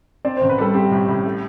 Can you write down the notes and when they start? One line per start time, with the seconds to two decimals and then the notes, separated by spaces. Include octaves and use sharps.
0.25 C4 D5
0.37 A1 C5
0.49 B4
0.58 G3 A4
0.74 C4 G4
0.91 A2
1.08 A2
1.25 A3